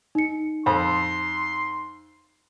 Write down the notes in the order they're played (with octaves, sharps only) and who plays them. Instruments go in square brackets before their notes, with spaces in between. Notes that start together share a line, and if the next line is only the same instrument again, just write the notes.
[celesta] D#4 C#7
[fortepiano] F2 [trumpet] C6